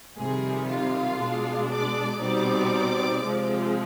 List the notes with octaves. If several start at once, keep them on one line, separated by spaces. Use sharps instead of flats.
F2 C3 D#3 G3 G#4
F4 F5
B2 G#3 D4
D5 D6
B2 G3 C4 D#4 D5 D6
C3 F3 G#3 C4